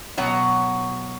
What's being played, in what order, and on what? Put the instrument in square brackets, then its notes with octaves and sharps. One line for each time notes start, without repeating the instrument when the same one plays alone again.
[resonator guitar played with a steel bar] B2 F#3 C#5 F#5